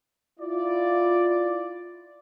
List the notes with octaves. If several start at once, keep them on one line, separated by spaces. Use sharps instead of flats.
E4 F4 D5